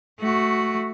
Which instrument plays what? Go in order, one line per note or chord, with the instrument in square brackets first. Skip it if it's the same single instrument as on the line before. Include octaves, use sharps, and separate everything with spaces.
[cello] A3 F#4